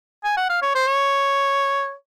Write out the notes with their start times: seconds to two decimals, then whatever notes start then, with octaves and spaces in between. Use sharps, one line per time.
0.24 G#5
0.37 F#5
0.49 F5
0.62 C#5
0.75 C5
0.87 C#5